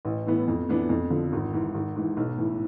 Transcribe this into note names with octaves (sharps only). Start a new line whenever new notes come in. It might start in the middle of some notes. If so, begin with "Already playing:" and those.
A1
A2 E3 B3
F2
E3 B3 D4
F2
D3 F3
G#1
G#2 E3
G#1
G#2 E3
B1
A2 E3